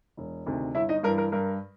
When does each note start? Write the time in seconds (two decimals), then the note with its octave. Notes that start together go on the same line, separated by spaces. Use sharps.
0.17 E1
0.46 D2 C3 D#3
0.75 G1 E4 E5
0.89 D#4 D#5
1.03 G2 E3 A#4
1.18 A#4
1.32 G2 A#4